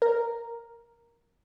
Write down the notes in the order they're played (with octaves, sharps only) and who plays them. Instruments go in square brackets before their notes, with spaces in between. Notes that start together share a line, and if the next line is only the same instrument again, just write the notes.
[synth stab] A#4